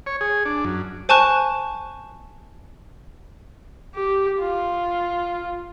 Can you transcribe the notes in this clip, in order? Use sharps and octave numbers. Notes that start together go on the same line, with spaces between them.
C#5
G#4
D4
F#2
C5 G#5 A5 C#6 F#6
G4
F4